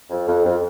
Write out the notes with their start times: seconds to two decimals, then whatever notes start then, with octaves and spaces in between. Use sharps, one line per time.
0.10 F2
0.27 F2
0.44 F2